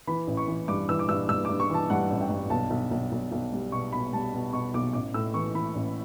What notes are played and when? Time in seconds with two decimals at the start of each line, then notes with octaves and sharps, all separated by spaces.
0.07 E3 B5
0.27 A1
0.37 C#6
0.47 E3
0.68 G2 D6
0.89 E3 E6
0.99 D6
1.09 G2 E6
1.29 G2 E6
1.45 D6
1.49 G2
1.60 C#6
1.69 E3 A5
1.90 G2 F#5
2.11 A1
2.21 G5
2.30 G2
2.50 B1 A5
2.70 B1
2.91 B1
3.12 B1
3.32 B1
3.53 G3
3.72 B2 C#6
3.92 B2 B5
4.13 G3 A5
4.33 B2
4.53 B2 C#6
4.74 B1 D6
4.93 A1 D6
5.14 A2 E6
5.34 E3 C#6
5.55 E3 B5
5.75 A1